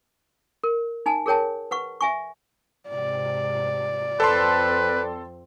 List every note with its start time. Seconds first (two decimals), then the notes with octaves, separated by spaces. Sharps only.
0.64 A#4
1.06 D#4 G#5 A5
1.26 G#4 A#4 C#5 G5 A5
1.71 B4 F#5 C#6
2.01 E5 G#5 C#6
2.89 G#2 C3 D5
4.20 F2 C4 A4 B4 A5 C6